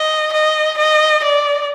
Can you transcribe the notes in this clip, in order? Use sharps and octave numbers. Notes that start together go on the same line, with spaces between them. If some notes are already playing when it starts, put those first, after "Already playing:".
Already playing: D#5
D#5
D#5
D5